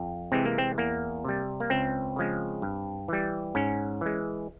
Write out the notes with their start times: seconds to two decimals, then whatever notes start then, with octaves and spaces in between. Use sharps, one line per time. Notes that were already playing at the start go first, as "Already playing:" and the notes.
Already playing: F2
0.32 C3 E3 G#3 C4
0.45 A#3
0.58 C4
0.78 E2 A#3
1.24 C3 G3
1.60 A#3
1.70 C#2 C4
2.16 C#3 F3 G#3
2.62 G2
3.08 E3 G3
3.55 G#2 C#4
4.01 E3 G#3